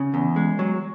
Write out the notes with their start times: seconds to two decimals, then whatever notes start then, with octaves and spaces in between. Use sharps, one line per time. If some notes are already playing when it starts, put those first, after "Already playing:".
Already playing: C#3
0.14 E2
0.36 G#3
0.59 F#3